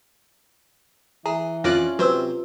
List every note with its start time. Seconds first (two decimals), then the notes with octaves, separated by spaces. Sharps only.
1.26 E3 G#4 A#5
1.64 F2 C#4 F4 D5 E5 D6 F#6
1.99 C3 F#3 B4 C5 E6